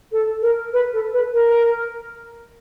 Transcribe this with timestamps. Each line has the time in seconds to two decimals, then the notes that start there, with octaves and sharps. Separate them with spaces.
0.11 A4
0.42 A#4
0.73 B4
0.93 A4
1.13 B4
1.32 A#4